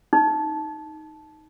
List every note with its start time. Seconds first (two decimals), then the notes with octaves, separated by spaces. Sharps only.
0.13 D#4